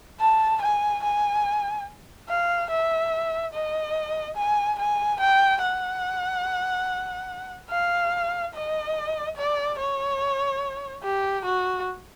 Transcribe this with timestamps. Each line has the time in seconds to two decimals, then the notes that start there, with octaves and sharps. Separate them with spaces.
0.20 A5
0.62 G#5
1.03 G#5
2.29 F5
2.70 E5
3.53 D#5
4.37 G#5
4.79 G#5
5.20 G5
5.62 F#5
7.70 F5
8.54 D#5
9.36 D5
9.78 C#5
11.03 G4
11.45 F#4